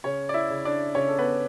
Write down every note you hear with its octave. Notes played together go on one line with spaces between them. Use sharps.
C#3 C#4 C#5
D5
E4 E5
C#3
D4 D5
C#3 C#4 C#5
A4
B3 B4